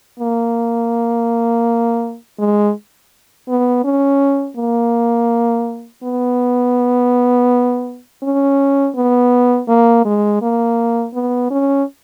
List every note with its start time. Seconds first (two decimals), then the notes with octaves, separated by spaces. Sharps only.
0.20 A#3
2.39 G#3
3.49 B3
3.84 C#4
4.57 A#3
6.03 B3
8.23 C#4
8.96 B3
9.68 A#3
10.05 G#3
10.42 A#3
11.14 B3
11.51 C#4